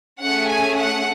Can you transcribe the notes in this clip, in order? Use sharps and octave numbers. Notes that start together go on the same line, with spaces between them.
A3 C#4 G#4 F#5
G#5
F#5